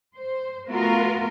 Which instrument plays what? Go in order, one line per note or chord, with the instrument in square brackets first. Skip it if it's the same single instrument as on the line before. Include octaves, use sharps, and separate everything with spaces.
[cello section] C5
A3 B3 F4 F#4 A#4